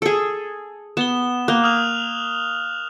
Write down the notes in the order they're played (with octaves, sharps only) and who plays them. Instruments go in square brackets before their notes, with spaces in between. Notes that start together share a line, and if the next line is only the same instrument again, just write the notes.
[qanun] G#4 A4
[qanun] B3 [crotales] E7 G7
[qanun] A#3 [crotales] F#6 F7 G7
[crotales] D#6 F6 F7